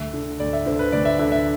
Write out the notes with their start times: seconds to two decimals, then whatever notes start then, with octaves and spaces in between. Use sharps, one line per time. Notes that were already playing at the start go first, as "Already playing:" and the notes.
Already playing: D2 E5
0.13 D3
0.40 D2 D5
0.53 E5
0.66 D3 C5
0.79 B4
0.92 D2 D5
1.05 E5
1.19 D3 E5
1.32 E5